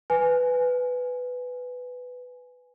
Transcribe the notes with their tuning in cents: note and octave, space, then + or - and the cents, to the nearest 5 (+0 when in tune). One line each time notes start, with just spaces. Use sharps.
B4 +10 G#5 +0